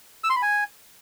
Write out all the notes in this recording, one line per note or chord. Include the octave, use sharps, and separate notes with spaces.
E6
C6
B5
G#5